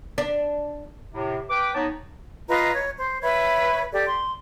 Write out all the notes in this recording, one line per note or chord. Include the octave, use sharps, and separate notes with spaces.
D4
A2 C3
B4 G5 D6
B3 D#4 C#5 A5
F4 B4 D#5 A#5
C#5
C5
B4 C#5 E5 B5
G4 A4 D5
C6